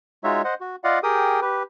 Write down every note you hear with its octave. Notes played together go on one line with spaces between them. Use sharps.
G#3 D#4 F4 F#4 C#5 E5
C5 D#5 F#5
F#4
F4 D5 D#5 F5 F#5
G4 G#4 A#4 G5 D#6
G4 B4